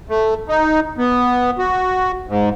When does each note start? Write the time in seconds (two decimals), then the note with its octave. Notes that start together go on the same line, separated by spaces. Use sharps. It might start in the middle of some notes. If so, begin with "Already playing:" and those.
0.09 A3
0.48 D#4
0.98 B3
1.58 F#4
2.28 G#2